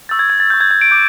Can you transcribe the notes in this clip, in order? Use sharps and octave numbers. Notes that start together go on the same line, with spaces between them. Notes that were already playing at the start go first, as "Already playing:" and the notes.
C#6 E6 G6 A6
G#6
G#6
A6
C#6 E6 G6
G#6
G#6
D7
D6 G6